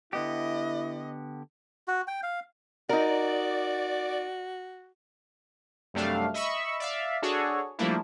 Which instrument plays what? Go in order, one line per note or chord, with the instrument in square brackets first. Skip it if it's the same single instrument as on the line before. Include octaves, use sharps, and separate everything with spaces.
[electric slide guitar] D3 B3 G4 [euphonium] E4 [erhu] D#5
[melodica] F#4
G5
F5
[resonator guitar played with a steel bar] D#4 A#4 [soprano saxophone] F#4 [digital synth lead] D5
[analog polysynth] F#2 C3 G3 A3 D4 F5
D#5 E5 B5 C#6 E6
D5 E5 F5
D4 F#4 G#4 A4 C#5
F3 G3 A3 A#3 D4 E4